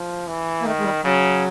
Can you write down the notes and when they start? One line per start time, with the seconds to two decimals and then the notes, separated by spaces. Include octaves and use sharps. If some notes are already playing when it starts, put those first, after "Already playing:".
Already playing: F3
0.27 E3
0.61 A#3
0.66 D#3 A3
0.79 G#3
0.85 G3
1.04 C#3 F#3